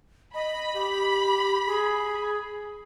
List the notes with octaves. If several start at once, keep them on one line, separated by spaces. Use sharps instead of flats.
D#5 B5
G4
G#4